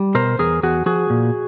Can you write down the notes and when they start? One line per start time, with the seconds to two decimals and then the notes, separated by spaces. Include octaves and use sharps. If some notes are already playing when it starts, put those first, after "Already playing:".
Already playing: G3
0.15 B2 A#4 C5
0.39 E2 G#4 A#4
0.63 E2 F#4 G#4
0.86 F3 F#4 G#4
1.10 A#2